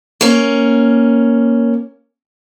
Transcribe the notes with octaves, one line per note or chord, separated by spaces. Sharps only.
A#3 C#4